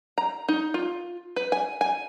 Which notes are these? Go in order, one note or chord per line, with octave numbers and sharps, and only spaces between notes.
A#5
D#4
F4
B4
G#5
G#5